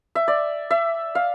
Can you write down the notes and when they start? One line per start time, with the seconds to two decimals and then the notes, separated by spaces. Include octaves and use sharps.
0.15 E5
0.28 D5
0.71 E5
1.15 F5